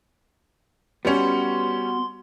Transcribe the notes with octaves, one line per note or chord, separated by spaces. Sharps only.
G3 B3 C#4 F#4 C6